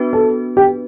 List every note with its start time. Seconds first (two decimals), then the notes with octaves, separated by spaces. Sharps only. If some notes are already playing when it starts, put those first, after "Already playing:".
Already playing: B3 D4 F#4 B4
0.13 A4
0.57 G4